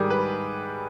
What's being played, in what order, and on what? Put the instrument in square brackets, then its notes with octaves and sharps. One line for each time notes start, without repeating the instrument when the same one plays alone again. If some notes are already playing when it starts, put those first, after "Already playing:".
Already playing: [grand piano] G#2 D#3 G3 G4 G#4
B4